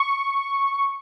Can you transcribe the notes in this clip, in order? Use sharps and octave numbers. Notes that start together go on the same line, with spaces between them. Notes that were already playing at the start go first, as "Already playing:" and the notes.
Already playing: C#6